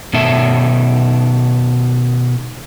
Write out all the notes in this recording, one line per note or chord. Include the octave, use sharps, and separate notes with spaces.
B2 D#3 A4 E5